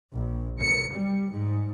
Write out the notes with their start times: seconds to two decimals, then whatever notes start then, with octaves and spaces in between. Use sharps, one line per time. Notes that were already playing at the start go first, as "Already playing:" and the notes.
0.13 A#1
0.60 C#7
0.93 G3
1.31 G#2